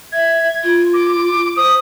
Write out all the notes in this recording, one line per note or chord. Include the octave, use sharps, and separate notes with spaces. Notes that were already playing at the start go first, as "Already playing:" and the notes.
E5 G#6
F4
D6
C5 D#6